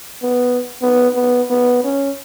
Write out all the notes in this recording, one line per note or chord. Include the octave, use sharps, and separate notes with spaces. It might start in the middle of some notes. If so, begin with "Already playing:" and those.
B3
B3
B3
B3
C#4